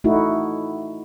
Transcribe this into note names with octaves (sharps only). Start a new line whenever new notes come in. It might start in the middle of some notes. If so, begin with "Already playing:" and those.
A3 D#4 E4 F#4